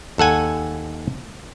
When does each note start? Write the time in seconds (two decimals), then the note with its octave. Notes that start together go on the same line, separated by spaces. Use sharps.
0.18 D#2 A4 F#5 G#5